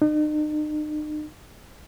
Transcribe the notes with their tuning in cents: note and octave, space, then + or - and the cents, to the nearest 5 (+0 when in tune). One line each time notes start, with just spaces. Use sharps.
D#4 -40